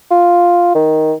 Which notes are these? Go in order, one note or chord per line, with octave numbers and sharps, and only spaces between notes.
F4
D#3